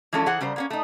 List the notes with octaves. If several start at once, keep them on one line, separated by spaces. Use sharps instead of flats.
E3 F3 G#3 C#4 A4
E3 G#4 C5 F#5
C#3 G3 A#4 C5
A#3 B3 C#4
A3 D#4